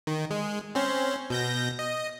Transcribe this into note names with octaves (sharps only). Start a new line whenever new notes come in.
D#3
G#3
C4 C#4 C5
B2 G6 A#6
D#5